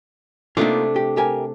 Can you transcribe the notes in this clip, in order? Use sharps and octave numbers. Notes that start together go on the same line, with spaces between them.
C3 A3 A#3 D4 D#4 F4
G4
G4 A#4 G#5